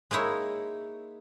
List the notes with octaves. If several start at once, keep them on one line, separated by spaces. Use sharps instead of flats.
G#3 A#3 D#4 E4 C#5